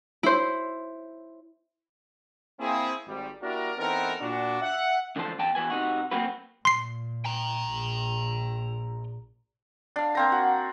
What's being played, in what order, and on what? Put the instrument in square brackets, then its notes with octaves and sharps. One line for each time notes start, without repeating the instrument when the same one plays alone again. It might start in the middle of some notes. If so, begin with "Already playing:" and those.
[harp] E4 C5
[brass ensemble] A#3 C4 E4 G#4
G#1 G3
A#3 D4 E4 F#4 G4 A#4
E3 B3 C4 D#4 A4 A#4
A#2 D4 F#4
E5 F#5
[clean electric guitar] C#2 D3 E3 F3 C5 A5
E2 E3 G5 A5
B2 E3 B4 G#5
C3 D#4 F#4
F#3 A#3 C4 F#4 B4
[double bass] A#2 [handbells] C6 C7
[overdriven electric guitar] G5 A#5
[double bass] A#1
[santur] D4 F5
A#3 C4 A#5
F#4